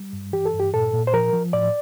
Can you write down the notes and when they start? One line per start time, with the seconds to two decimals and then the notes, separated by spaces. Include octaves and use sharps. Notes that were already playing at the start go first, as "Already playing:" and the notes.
Already playing: G3
0.13 G2
0.33 E3 G4
0.45 A4
0.53 G2
0.60 G4
0.74 A#2 A4
0.94 A#2
1.07 C5
1.14 F3 A#4
1.33 F3
1.53 A2 D5